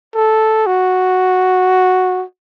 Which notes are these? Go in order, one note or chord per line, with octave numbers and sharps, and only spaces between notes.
A4
F#4